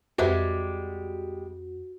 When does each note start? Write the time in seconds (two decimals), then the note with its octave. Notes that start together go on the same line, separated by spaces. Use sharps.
0.18 F2 G3 G#3 F#4 G4 B4 C5 E5